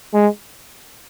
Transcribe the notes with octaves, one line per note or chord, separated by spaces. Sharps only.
G#3